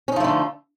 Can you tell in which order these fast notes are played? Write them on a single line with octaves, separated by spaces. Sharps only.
C#4 D#4 F3 A3 D3